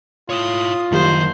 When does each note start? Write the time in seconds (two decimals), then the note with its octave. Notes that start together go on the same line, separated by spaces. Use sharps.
0.30 E4 F4 C#5 D#6
0.92 F#1 D#3 G3 C5